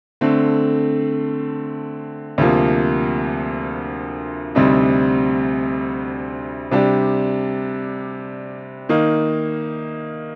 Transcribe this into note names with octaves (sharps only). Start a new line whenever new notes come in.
D3 A3 C4
D2 C3 F3 A#3
D2 C3 G3 C4 D#4
C3 G3 D4 G4
D#3 A#3 D#4